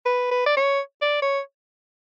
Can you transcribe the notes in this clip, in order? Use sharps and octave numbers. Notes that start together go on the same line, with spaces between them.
B4
B4
D5
C#5
D5
C#5